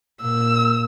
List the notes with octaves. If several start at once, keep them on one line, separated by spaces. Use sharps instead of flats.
A#2 E6